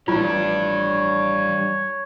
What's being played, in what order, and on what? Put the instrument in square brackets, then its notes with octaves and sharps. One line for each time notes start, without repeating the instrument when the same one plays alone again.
[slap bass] A1 F3 [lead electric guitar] G3 D4 [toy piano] F4 [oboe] C#5